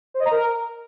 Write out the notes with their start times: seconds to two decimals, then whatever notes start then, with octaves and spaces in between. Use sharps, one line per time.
0.14 C5
0.20 D#5
0.26 A#5
0.31 A#4